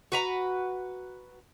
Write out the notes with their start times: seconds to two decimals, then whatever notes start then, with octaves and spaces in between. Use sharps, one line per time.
0.12 F#4 B4 A#5